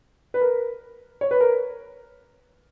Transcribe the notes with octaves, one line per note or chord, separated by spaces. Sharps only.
B4
A#4
C#5
B4
A#4